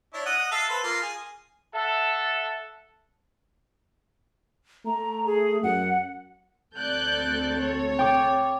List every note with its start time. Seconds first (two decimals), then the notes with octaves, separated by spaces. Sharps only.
0.14 D4 E4 C#5
0.26 D#5 F#5 D#6
0.51 A4 E5 F5
0.69 A4 B4 C5
0.83 A#3 F4
1.02 G#4
1.74 A4 E5 F#5 A5
4.86 A3 A#5
5.26 G#4
5.63 F#2 F#5
6.77 D2 C4 A4 D5 F#6 G6
7.62 C#5
7.99 G5 D6